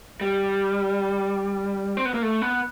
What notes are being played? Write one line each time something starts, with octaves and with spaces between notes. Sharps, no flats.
G3
C4
B3
A#3
A3
B3